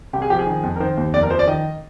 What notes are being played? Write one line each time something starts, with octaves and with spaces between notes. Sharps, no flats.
C2 G4
G#4
F3 G4
G#4
D#3
F2
A#4
D#3 C5
D#2
F2 D5
A#4
F3 C5
D5
D#3 D#5